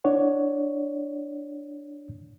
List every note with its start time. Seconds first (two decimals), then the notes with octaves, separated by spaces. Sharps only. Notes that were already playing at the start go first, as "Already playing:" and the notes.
0.04 D4 E4 C#5 D5 F#5